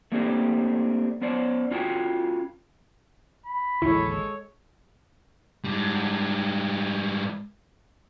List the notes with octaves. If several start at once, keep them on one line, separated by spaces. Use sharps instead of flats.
A3 A#3 C4 D4 G4 G#4
B3 C#4 C5 D5
C#4 F4 F#4 G5 G#5
B5
A1 D#2 D3 G#3 E4 A4 C#5
G#2 G3